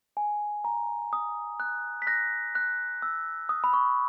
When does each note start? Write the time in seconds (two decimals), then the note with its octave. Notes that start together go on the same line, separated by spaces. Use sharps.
0.17 G#5
0.65 A#5
1.13 D#6
1.60 F#6
2.02 B6
2.07 F#6 A#6
2.55 F#6
3.02 E6
3.49 D#6
3.64 B5
3.74 C#6